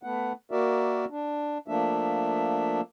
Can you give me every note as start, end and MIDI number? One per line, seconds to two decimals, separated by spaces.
0.03 0.33 57
0.03 0.33 59
0.03 0.33 78
0.51 1.05 58
0.51 1.05 66
0.51 1.05 70
0.51 1.05 74
0.51 1.05 76
1.10 1.58 62
1.68 2.81 53
1.68 2.81 57
1.68 2.81 58
1.68 2.81 62
1.68 2.81 76